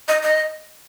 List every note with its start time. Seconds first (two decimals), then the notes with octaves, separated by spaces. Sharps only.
0.08 D#5
0.23 D#5